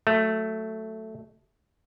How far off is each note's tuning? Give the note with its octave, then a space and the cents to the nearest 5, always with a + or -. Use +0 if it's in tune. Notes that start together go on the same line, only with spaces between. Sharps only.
F#3 +0 A3 +0